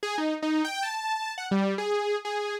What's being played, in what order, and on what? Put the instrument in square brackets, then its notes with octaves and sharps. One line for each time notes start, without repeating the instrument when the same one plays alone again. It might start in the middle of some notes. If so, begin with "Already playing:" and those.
[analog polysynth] G#4
D#4
D#4
G5
A5
F#5
G3
G#4
G#4